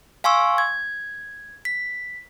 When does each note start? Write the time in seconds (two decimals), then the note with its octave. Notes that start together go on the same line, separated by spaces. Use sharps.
0.24 F5 G#5 C6 C#6 E6
0.58 G#6
1.65 B6